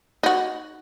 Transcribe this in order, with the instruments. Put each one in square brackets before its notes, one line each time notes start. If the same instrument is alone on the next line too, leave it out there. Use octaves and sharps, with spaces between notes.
[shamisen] D#4 F#4